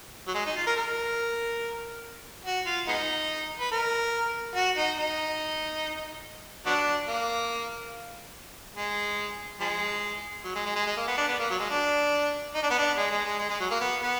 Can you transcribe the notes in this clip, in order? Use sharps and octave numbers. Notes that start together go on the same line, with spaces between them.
F#3
G#3
D#4
F4
A#4
A#4
F#4
F4
G#3 B3 D#4
B4
A#4
F#4
D#4
D#4
F#3 B3 D4
A#3
G#3
F3 G#3
F#3
G#3
G#3
G#3
G#3
A#3
B3
D4
B3
A#3
F#3
G#3
D4
D#4
D4
B3
D4
G#3
G#3
G#3
G#3
G#3
F#3
A#3
B3
B3